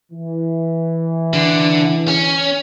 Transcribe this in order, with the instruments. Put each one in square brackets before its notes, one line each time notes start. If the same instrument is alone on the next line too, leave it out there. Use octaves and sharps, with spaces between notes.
[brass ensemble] E3
[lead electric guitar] D3
C#4